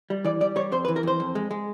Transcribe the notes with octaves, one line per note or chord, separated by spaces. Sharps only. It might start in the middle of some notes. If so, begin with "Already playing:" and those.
G3
E3 D5
G3 D5
G3 C#5
F2 C5
B4
E3
A#4
F2 C5
F2
G#3
G#3